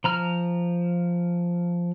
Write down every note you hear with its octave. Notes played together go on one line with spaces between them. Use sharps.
F3 A#5 F6